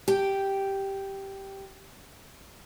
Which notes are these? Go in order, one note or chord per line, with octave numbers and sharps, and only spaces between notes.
G4 G5